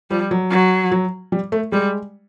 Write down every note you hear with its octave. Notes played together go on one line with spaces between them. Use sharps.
F3 G3
F#3
F#3
F#3
G3
A3
G3 G#3